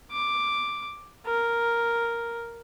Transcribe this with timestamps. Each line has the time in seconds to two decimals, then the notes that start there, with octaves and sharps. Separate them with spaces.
0.12 D6
1.26 A#4